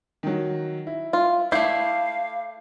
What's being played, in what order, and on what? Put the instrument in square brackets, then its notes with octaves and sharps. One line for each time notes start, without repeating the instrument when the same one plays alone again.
[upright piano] D#3 F#3
E4
[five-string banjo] F4
[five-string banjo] A3 E4 [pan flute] F5 [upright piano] D6 G6 C7